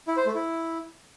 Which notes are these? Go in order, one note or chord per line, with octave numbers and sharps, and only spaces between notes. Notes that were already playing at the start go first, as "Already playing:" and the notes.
E4
C5
A3
E4